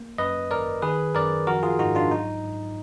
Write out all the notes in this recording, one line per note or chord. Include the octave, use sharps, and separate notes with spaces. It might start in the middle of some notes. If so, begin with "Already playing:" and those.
Already playing: A#3
F#2 B4 D#5
G#1 A#4 D5
D#3 G#4 B4
F#2 A#4 D5
F3 F#4 A#4
F4 G#4
G#2 D#4 F#4
D4 F4
F#3 D#4
G#2